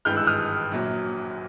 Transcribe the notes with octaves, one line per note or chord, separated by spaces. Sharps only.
G#1 G2 E3 G#3 F6 G6
E6 F#6
D#6 F6
A#1 A#2 F#3